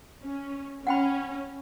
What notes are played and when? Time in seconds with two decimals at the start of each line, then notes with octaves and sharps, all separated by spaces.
0.23 C#4
0.87 C#4 F#5 G5 B5